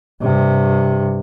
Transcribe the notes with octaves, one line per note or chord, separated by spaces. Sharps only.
G2 C3